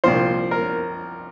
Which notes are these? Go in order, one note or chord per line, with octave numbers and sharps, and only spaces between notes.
C2 A#2 F3 C5
A#4